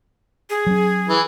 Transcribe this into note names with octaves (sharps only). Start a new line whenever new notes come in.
G#4
F#3 C#4
E3